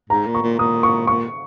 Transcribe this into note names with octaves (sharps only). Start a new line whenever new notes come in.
G#2 A#5
A#2
C#6
A#2
A#2 D#6
C#6
A#2 C#6